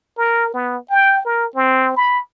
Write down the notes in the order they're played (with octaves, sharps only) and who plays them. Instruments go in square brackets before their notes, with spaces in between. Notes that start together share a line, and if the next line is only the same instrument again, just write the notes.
[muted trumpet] A#4
B3
G5
A#4
C4
B5